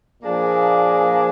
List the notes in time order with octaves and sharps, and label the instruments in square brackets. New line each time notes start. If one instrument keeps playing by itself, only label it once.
[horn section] A#2 F3 A#3 D4 G#4